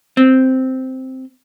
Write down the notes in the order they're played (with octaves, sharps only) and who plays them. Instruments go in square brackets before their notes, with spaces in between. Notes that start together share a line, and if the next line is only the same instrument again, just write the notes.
[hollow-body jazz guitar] C4